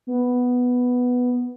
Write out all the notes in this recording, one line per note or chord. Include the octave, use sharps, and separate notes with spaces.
B3